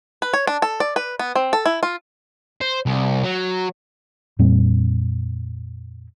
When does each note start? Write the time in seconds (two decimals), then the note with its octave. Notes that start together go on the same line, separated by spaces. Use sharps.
0.22 B4
0.33 C#5
0.47 D4
0.62 A4
0.80 D5
0.96 B4
1.19 B3
1.35 C4
1.53 A4
1.66 E4
1.83 F4
2.61 C5
2.86 C2
3.24 F#3
4.39 F2 A#2 G3 C4